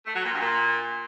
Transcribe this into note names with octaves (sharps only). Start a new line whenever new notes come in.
A3
F#3
A#2
G2
A#2